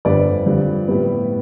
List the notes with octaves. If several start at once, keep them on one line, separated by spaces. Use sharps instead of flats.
G1 F2 D3 G3 B4 D5
G2 D3 F3
A2 G3 B3